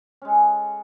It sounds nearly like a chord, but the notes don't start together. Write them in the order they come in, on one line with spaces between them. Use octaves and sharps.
C#4 G#3 A4